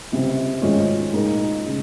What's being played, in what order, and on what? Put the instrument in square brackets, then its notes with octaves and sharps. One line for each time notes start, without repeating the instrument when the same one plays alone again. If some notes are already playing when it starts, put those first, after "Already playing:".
[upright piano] C#2 C3 G3 C4
G#2 D#3 G#3 C#4 F4
A#2 G#3 D#4 A#4
C#3 G#3